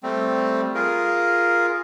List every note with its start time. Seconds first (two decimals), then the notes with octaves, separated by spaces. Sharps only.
0.03 G3 A3 C4
0.75 F4 G#4 A#4